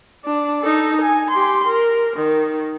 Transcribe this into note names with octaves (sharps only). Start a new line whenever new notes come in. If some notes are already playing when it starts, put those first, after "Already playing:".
D4
D#4 A4
G#5
G4 C6
A#4
D#3